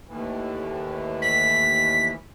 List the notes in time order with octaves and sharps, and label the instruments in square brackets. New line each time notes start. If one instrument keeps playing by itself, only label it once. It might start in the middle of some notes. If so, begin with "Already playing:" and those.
[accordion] D#2 A2 E3
[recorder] B6